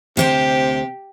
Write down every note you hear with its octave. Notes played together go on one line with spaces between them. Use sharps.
D2 C3 G4 C5 G5